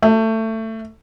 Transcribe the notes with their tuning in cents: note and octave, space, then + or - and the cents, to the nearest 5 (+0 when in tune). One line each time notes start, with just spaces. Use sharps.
A3 +20